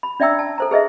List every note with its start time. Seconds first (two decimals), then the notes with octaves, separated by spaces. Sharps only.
0.03 B5
0.20 D4 D5 E5 G5 A#5 E6
0.39 A5
0.58 A4 C5 A#5
0.71 G#4 B4 D#5 E5